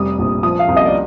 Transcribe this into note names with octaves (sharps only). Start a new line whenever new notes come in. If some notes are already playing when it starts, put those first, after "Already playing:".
Already playing: F1 G3 D#6
A#1
F3 D#6
F5
C2
D#5
D5